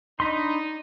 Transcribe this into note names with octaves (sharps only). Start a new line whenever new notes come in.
D4 D#4 B5 C6